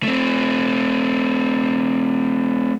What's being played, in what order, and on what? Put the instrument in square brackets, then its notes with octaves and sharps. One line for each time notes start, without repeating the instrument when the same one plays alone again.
[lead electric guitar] A3 C4